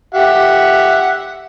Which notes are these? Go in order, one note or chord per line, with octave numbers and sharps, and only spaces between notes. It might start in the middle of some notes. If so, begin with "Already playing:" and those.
G4 E5 F#5